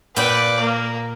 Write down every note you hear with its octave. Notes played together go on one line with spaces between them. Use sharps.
A#2 B4 D5 G5
A#3